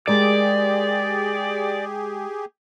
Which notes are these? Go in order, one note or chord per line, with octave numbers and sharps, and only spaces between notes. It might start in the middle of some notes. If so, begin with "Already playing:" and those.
G#3 G4 G#4 A#4 D5